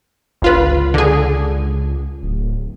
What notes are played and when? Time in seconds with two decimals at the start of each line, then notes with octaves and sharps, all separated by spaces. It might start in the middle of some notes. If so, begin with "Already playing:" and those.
0.42 G1 C#2 F4 B4
0.94 D3 G#4
2.23 D1